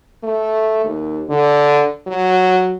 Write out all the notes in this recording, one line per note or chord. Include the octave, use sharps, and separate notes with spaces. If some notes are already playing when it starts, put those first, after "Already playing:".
A3
D#2
D3
F#3